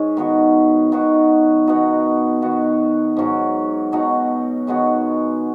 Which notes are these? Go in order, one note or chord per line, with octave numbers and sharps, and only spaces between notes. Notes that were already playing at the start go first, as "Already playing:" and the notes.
Already playing: G#2 G#3 C#4
D#3 B3 F#4
D#3 B3 F#4
B2 B3 D#4 F#4
D#3 B3 F#4
G#2 F#3 C#4 F#4
B2 F#3 D#4 F#4
D#3 G#3 B3 F#4